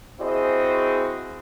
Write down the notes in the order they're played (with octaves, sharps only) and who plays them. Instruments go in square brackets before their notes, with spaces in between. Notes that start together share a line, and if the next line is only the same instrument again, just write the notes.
[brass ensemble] C4 E4 F#4 G#4 C5 D#5